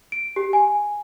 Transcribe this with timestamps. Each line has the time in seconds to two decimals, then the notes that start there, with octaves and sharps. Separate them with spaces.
0.12 D7
0.36 G4
0.53 G#5